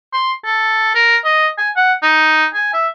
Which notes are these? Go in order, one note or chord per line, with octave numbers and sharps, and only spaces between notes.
C6
A4
A#4
D#5
G#5
F#5
D#4
G#5
E5